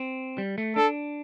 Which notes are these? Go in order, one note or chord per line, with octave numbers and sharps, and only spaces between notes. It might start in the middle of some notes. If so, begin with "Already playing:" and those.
Already playing: C4
G3
A3
D4 A4